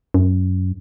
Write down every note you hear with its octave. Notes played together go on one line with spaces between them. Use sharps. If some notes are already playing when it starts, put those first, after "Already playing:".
F#2